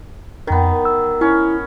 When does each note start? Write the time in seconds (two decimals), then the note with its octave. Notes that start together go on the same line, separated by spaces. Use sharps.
0.47 F2 D#3 B3 A#4
0.85 E6
1.21 C#4 E4